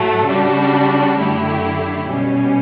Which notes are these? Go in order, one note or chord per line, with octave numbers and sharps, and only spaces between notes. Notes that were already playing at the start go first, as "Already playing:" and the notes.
Already playing: A2 F#3 A3
C#3 G3 D4 F#4
F#2 D3 A3 E4 G4
B2 G3 C#4